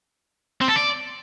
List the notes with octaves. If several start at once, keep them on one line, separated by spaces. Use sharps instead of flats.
C4
A4
D5